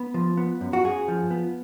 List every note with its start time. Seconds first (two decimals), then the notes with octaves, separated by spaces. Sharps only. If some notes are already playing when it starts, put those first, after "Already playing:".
Already playing: B3
0.14 F3
0.37 B3
0.61 F#2
0.73 F#4
0.84 F#2 G#4
1.08 F3
1.31 B3